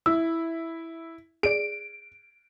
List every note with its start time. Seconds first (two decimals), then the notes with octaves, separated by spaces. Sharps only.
0.06 E4 E6
1.43 G#4 D5 D7